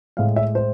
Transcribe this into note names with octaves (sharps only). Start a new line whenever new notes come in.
A2 G#3 F5
E5
C5